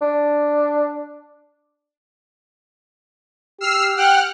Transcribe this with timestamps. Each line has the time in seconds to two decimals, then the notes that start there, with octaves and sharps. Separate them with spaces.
0.02 D4
3.61 G4 E6 F6 C7
3.96 F#5 G5 F6 F#6